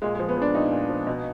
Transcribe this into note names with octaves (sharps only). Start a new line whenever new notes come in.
A#2 G#3
F3 G#3
B3
F3
D4
A#2 D#4
A#2
F3
B2